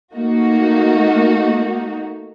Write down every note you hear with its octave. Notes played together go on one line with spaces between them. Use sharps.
A3 A#3 D#4 F#4